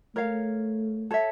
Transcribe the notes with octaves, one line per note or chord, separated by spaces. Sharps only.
A3 A#4 C#5 F5
A4 C#5 E5